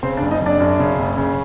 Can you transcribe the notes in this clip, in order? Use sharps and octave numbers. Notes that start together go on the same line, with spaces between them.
C#3 C4 C5
D4 D5
F#1
D#4 D#5
F#1 D4 D5
F#2
C#3
F#1
C#3